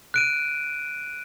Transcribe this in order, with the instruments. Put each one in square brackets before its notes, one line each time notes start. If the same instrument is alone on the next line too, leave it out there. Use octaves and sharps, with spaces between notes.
[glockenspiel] F#6 D7 D#7